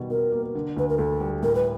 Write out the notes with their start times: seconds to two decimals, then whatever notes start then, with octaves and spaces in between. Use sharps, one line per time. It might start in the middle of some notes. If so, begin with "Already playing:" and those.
Already playing: B2 D#3 G3
0.10 B2 A#4
0.32 A#3
0.55 D3
0.76 D2 B4
0.89 A#4
0.98 D2 A4
1.20 G3
1.42 A2 A#4
1.55 B4